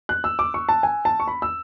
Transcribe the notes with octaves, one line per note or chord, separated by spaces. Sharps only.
F#6
E6
D6
C#6
A5
G#5
A5
C#6
B5
E6